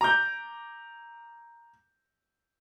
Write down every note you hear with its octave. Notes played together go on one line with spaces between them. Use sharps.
A#5 D6 G6